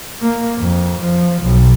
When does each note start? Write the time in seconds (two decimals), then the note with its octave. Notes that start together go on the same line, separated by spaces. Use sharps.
0.22 A#3
0.58 F2
1.01 F3
1.43 B1